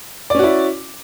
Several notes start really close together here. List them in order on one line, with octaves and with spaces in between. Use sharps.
D5 C#4 F#4 E4